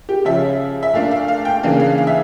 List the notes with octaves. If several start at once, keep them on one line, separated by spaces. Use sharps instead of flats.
G4
C#3 F3 C#4 E5
E5
A#2 A3 D4 F5
F5
F5
G5
C#3 E3 A#3 D4 F5
F5
F5
E5